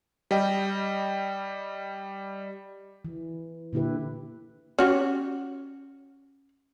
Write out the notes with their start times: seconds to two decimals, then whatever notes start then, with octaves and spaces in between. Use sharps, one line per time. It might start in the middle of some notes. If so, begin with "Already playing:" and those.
0.31 G3 D#5 G5
3.05 E3
3.73 A#2 D3 E4 G4 B4
4.79 C#4 F#4 G4